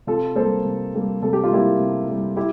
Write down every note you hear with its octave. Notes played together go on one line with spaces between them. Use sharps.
C3 F4 A4
G3 A#3 A4 C5
C3
G3 A#3
C3 A4
G4
F4
G3 A#3 E4 G4
C3
G3 A#3
E4 G4